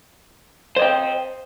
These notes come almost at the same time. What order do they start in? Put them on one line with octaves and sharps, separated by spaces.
C5 D#5 G5